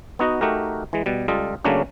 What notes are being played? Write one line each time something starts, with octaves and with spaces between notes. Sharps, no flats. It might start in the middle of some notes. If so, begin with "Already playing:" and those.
B3 D#4 F#4 D#5
A3 D#4 F#4 G4 A#4
E3 G#3
B2 G3
C#2 G3 F4 A4 D#5
C#3 F#3 A3 A#3 C#4 D4